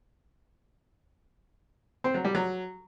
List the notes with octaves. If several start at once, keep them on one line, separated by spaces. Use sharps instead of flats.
C4
F#3
G3
F#3